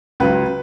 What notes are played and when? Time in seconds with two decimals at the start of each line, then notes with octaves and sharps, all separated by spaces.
0.20 C#2 C#3 F#3 B4